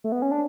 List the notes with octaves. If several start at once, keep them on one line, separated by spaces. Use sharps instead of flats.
A3
B3
C#4
D4